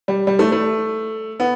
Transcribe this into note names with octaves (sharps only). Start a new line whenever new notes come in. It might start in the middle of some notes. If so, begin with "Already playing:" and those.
G3
G3
A3
A3
B3